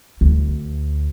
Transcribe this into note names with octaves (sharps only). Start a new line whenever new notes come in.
D2